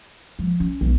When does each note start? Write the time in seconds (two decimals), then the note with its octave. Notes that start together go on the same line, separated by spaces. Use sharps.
0.39 F3
0.60 C#4
0.81 B1